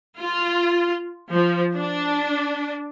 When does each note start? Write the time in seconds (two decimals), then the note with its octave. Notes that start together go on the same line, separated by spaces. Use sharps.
0.21 F4
1.32 F3
1.76 D4